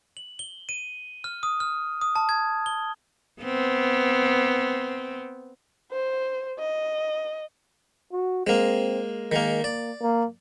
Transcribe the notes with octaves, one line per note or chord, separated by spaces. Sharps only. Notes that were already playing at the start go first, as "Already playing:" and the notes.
F#7
G7
D#7
F6
D#6
F6
D#6
A5
G#6
G7
B3 C4
C5
D#5
F#4
G#3 A#3 C4
D#3 G#3 A#3
A#3 D5
A#3